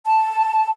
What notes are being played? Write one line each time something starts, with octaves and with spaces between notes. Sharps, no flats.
A5